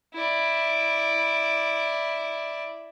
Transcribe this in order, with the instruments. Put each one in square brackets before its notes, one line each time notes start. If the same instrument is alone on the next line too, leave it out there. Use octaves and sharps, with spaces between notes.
[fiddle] E4 D5